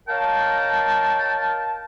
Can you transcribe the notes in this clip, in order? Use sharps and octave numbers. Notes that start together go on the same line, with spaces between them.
A#4 C#5 D#5 F5 G5 A5